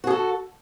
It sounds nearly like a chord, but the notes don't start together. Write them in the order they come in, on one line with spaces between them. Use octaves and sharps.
F#4 G#4 A4